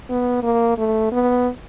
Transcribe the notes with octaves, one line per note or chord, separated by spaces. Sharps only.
B3
A#3
A3
B3